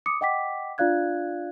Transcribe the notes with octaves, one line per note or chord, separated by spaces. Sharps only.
D6 D#6 C#7
D#5 F#5 G5 D6 B6
D4 F4 D5 F5 F#6 G#6